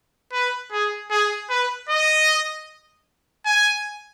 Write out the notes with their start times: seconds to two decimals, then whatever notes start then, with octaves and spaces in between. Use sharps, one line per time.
0.33 B4
0.72 G#4
1.11 G#4
1.50 B4
1.89 D#5
3.46 G#5